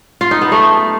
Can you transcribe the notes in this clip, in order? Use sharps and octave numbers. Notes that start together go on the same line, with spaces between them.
F4
D#4
B3
A3